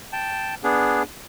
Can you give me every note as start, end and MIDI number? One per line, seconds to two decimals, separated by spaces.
0.13 0.55 79
0.13 0.55 81
0.63 1.03 59
0.63 1.03 62
0.63 1.03 68